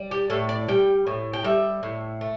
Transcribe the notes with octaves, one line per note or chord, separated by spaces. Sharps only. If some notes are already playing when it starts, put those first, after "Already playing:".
Already playing: G3
G4
A2 A4
D5
G3 G5
A2
G5
G3 E5
A2
A3